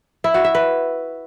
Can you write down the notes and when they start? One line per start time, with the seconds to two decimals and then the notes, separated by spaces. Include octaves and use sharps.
0.24 E4
0.34 F#4
0.44 E5
0.55 B4